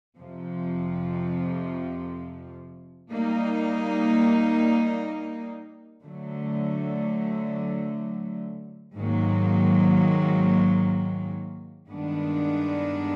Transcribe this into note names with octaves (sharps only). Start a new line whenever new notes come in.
F2 C3 F3
G3 A#3 D#4
D3 F#3 A3
G#2 D#3 F#3 A#3
G2 D#3 G#3 B3 D4